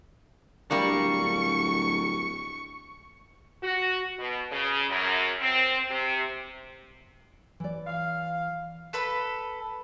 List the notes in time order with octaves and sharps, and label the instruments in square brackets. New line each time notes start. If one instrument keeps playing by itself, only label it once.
[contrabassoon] D1 [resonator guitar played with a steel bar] G3 A#3 D4 [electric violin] C#6
[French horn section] F#4
B2
C#3
F#2
C4
C3
[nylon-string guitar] E3 D5
[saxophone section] F5
[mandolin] A4 B4 B5